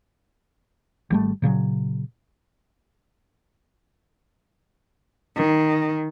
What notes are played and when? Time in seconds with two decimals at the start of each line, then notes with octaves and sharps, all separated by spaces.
1.11 G#1 G3 A3
1.42 A#2 C#3 F3 F#3
5.37 D#3